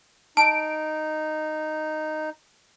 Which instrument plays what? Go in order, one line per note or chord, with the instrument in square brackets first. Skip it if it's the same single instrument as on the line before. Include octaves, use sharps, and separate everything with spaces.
[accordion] D#4 [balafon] A5 [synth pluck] D7